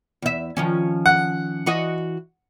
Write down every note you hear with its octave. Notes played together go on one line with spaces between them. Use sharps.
E2 E5
D#3 F3 C#4
F#5
E3 F#4 D#5